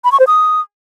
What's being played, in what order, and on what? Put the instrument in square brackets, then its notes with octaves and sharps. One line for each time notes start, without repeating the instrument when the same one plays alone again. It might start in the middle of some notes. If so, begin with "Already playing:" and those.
[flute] B5
C#6
C5
D#6